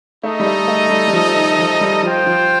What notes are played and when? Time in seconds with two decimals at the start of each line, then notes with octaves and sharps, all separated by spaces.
0.24 A3 D#4 A4 D#5
0.40 G3
0.46 A3
0.68 A3
0.90 G3
1.08 G3
1.13 F3
1.36 D#3
1.59 F3
1.81 G3
2.03 F3 F4 C5 G5
2.26 F3